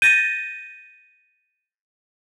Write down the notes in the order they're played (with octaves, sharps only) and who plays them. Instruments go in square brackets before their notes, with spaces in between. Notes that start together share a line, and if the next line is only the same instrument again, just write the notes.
[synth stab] G6 A6 A#6 [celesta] D#7